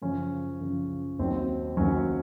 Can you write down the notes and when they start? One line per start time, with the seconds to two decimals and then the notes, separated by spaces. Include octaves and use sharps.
0.02 F#2 C#3 F3 C#4
0.61 F#2 C#3 F3
1.19 D#2 D#3 F#3 C4
1.77 D#2 D#3 F#3 C#4